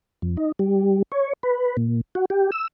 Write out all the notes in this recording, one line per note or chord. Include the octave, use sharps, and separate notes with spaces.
F2
D#4
G3
C#5
B4
A#2
F#4
G4
E6